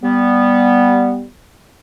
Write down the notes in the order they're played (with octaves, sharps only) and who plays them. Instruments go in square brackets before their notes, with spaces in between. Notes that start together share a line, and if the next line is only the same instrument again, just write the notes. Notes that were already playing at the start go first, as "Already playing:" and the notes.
[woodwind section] G3 B3